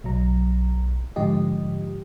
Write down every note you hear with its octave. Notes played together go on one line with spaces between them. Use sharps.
B1 F#3 A#5
G#2 D3 F3 G4 D#5